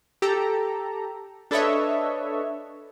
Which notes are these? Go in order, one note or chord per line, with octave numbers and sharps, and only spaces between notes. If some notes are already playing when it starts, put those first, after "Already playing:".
G4 A4 A#5
D4 A4 B4 C#5 D#5 E5